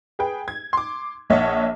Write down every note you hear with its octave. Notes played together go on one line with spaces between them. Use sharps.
G#4 B4 G5
G#6
C6 D6
A#1 C#5 D#5 E5 F#5 A5